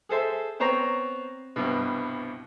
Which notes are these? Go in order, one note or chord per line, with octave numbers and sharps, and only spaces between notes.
G#4 A4 C5 E5
B3 C4 C5 C#5 A#5
C2 G2 B2